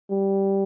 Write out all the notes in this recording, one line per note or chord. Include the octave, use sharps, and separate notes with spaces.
G3